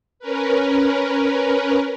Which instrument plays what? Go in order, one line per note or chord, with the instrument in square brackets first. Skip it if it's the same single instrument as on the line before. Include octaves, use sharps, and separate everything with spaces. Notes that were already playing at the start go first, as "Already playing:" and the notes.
[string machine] C#4 A#4 B4